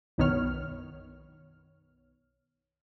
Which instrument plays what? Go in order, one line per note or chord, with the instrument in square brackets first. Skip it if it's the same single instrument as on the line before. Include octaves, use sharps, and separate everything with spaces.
[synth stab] B1 F#2 D#3 B3 C#5 F6